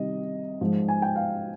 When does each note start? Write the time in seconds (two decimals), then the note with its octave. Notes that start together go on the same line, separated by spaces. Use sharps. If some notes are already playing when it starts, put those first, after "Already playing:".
Already playing: C3 D#3 G3 D#5
0.61 G#2 F3 G#3
0.88 G#5
1.02 G5
1.16 F5